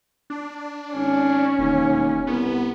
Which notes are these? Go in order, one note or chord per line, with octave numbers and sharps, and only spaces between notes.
D4
G#1 C#4
E1 D#2
C2 B3